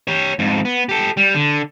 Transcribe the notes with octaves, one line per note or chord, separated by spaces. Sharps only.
G4 C#5
F2 G#2
B3
G4 A4
G3
D3